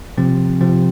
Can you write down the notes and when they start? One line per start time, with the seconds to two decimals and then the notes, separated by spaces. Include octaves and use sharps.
0.18 C3 F3 C4
0.61 C3 F3 C4